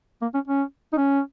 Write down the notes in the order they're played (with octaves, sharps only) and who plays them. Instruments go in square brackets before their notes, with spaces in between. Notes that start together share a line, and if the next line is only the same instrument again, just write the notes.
[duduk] A#3
C#4
C#4
D#4
C#4